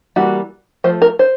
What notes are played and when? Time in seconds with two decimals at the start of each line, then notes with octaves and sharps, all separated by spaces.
0.16 E3 G3 A#3 F#4
0.84 F3 A3 C5
1.02 A#4
1.19 C5